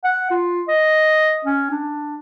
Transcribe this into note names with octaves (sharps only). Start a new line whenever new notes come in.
F#5
F4
D#5
C#4
D4